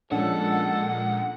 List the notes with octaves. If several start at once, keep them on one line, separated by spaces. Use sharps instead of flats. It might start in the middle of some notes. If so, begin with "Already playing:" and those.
A#2 F3 G#3 C#4 D4 A4 F#5